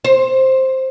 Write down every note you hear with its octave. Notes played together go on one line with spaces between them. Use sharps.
C5